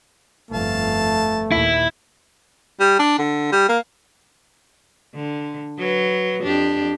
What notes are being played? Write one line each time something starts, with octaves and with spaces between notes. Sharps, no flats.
G1 F2 A3 F5 A5
D#2 A#2 E4
G3
D4
D3
G3
A#3
D3
F#3 B4
F2 D4 G4